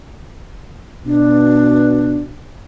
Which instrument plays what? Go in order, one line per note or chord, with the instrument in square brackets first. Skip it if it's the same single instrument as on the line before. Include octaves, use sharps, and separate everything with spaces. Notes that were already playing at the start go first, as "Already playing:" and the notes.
[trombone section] B2 [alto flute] D4